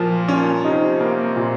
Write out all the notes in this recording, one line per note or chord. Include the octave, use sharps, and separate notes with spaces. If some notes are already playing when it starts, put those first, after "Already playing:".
Already playing: A#2 F3
C#4
C3 D#4
A#3
A#2